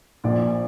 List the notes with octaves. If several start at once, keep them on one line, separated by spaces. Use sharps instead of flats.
A#1 A#2 D5